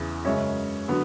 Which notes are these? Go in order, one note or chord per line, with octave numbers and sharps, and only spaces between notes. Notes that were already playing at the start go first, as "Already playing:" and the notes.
Already playing: E2 C#3 E3
F#2 C#3 G#3 C#4 C#5 E5
D3 F#3 B3